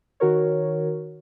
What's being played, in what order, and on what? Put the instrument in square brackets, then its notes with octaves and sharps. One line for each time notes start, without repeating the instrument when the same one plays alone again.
[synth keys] D#3 F#4 A#4 C#5